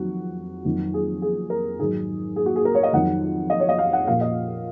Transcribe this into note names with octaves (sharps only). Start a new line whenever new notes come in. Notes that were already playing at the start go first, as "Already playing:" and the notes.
Already playing: F2 D#3 F#3 F#4
F2 D#3 F#3
G#4
G#4
A#4
G#2 D#3 F#3 G#4
G#4
F#4
G#4
A#4
C#5
D#5
F2 D#3 F#3 F#5
D#5
C#5
D#5
F5
F#5
A#2 F3 F5
D#5